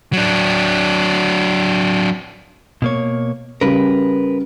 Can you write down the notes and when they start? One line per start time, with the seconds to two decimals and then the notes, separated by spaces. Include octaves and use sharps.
0.13 F#3 D4
2.82 B2 A#3 C#5
3.61 C#3 G3 A#4 B4